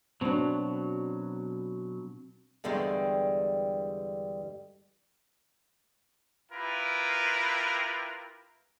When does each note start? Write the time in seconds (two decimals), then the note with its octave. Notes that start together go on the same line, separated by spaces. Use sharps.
0.21 B2 F#3 C4 D4
2.64 E2 G2 D3 G3 G#3
6.52 E4 F4 G4 A#4 B4